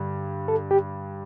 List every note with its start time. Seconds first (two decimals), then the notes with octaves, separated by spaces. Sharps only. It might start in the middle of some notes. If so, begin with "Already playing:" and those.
Already playing: G2 D3 G3
0.48 A4
0.71 G4